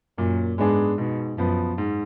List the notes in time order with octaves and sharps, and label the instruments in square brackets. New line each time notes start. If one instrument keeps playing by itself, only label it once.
[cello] F#2 [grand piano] A#2
[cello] G#2 [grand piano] G#3 B3 D4 G#4
[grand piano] G#2 [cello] B2
[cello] F#2 [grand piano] F3 B3
[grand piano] G#2